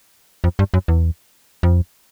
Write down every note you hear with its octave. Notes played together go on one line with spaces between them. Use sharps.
F2
G2
F#2
E2
F2